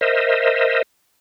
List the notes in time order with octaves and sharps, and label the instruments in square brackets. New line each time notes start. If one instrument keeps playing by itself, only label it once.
[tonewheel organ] A#4 C5 D#5 E5